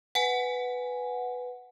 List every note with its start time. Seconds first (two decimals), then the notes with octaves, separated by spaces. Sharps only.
0.15 B4 F#5 G#5